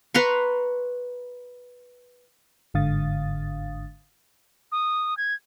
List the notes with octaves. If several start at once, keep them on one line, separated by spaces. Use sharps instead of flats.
B4 A#5 C6 C#6
G1 G#2 D3 F5 D#6 A6
D#6
G#6